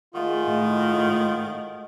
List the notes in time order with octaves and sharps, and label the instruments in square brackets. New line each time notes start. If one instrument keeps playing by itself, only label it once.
[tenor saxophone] D#3 [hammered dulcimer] G#3 A3 F#4 [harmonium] F4
[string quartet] A2